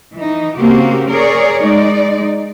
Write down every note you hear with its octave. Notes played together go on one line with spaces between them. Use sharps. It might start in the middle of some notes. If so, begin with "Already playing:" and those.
E3 D#4
C#3 A#3 C4 F#4 G4
G#4 A#4 C#5 D5
G#3 D#4 D5